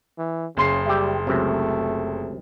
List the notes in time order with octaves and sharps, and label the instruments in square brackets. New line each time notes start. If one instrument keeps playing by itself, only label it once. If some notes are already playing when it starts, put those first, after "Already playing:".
[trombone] E3
[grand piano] F#1 C6 C7 [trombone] C#3
[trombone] G3 [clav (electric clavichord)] G4 E5
[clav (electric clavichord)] C#2 F#2 C3 [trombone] A3